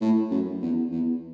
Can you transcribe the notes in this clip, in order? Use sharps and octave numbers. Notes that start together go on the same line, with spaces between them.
A2
F#2
E2
E2